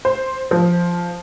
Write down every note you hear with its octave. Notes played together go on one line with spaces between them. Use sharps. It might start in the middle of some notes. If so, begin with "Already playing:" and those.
C5
F3